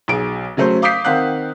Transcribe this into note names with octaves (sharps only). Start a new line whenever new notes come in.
B1 G#4 D7
C#3 F#3 A3 C5
F5 D6 D#6 G6 B6 C7
D#3 C4 F5 F#5 F#6